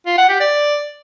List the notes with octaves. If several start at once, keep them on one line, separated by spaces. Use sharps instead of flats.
F4
F#5
G4
D5